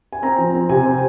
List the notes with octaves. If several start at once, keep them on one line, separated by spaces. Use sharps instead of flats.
G#5
C4 A#5
F3
C4
C3 G#5
C4